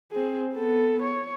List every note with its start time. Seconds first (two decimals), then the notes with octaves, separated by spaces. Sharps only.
0.12 C4 G#4
0.55 B3 A4
1.02 C#5